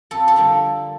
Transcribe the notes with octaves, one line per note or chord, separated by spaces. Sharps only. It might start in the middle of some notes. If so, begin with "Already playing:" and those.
F2 A4
A4
D3 G3 A#3